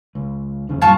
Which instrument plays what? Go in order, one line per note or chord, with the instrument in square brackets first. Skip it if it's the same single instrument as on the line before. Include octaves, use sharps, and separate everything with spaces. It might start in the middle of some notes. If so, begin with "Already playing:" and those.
[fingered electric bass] C#2
F1 D#2 C#3
[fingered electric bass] F#2 A#2 G3 [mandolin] F4 A5 C#6